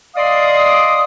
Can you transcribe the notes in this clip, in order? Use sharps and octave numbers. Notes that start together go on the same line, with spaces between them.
D5 D#5 F5 C6 D#6